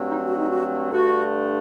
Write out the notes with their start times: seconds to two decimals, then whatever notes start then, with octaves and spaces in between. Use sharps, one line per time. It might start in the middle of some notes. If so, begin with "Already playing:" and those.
Already playing: G2 F#3 A3 C4
0.09 D#4
0.26 F#4
0.37 D#4
0.50 F#4
0.91 G2 D3 A3 D4 F#4